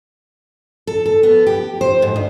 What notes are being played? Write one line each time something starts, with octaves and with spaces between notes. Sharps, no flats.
A4
A4
B3
G4
C5
G#2
D2